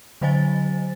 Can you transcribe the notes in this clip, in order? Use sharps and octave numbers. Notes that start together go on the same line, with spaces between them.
D3 F#3 C5 D#5 G#5 A6